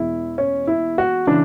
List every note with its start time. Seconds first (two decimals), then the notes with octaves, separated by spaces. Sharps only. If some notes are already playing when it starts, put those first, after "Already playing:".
Already playing: E2 B2 G#3 E4
0.38 C#4
0.67 E4
0.98 F#4
1.27 C#3 E3 D4